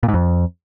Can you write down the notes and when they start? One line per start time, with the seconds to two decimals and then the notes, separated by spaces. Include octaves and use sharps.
0.03 A#2
0.08 G#2
0.14 F2